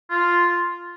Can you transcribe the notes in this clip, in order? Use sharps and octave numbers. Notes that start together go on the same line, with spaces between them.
F4